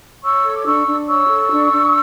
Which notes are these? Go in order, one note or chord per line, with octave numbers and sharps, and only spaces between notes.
C#5 C#6 E6
A4
D6
D4 C#6 E6
D4
C#5 C#6 E6
A4
D4
D4